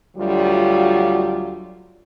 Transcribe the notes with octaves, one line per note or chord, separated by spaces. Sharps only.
D2 F#3 G3 F4